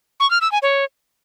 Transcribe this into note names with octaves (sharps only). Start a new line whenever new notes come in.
C#6
F6
E6
G#5
C#5